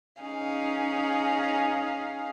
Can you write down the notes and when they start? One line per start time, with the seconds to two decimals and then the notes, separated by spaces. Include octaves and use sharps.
0.22 C#4 D#4 G#4 F5